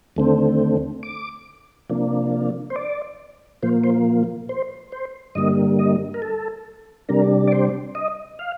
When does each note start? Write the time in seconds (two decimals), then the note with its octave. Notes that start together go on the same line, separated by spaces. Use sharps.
0.16 D#2 D3 A3 C4
1.03 D6
1.90 C3 F3 A#3 D4
2.70 C5
2.76 D5
3.63 A#2 F3 A#3 C5
3.84 C5
4.49 C5
4.92 C5
5.35 G2 D3 G3 A#3 D#5
5.79 D#5
6.14 A#4
6.22 A4
7.09 C3 G3 D4 A#4
7.48 D5
7.52 C5
7.95 D#5
8.39 F5